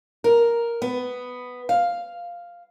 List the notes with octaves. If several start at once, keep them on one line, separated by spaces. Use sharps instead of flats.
A#4
B3
F5